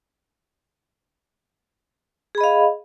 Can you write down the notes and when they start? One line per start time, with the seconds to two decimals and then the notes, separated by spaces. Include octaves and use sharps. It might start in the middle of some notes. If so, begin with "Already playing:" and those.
2.35 G#4
2.38 B5
2.41 D#5
2.44 F5